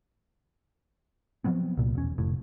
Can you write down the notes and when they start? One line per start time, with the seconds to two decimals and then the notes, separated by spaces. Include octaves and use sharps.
1.44 F3 F#3 B3 C4
1.78 C2 A#2
1.95 E1 C#4
2.18 F1 A2